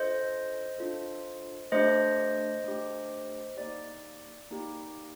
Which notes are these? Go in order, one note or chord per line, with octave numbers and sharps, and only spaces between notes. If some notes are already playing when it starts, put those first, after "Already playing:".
Already playing: D4 F4 A4 C5 D#5
D4 F4 A4
A3 D4 G4 C5 D#5
A3 D4 G4
A#3 D#4 G4 D5
A#3 D#4 G4